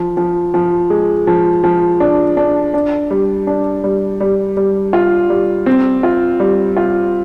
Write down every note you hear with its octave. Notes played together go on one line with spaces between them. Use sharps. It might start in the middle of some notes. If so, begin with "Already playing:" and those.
Already playing: F3
F3
F3
G#3
F3
F3
D4
D4
D4
G3
D4
G3
G3
G3
F4
G3
C4
F4
G3
F4